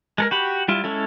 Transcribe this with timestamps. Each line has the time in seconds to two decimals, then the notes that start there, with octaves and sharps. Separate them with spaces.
0.18 G#3 A4 A#4
0.31 F#4 G4 B5
0.68 G3 E4 F4
0.84 G#3 C#4 E4 A4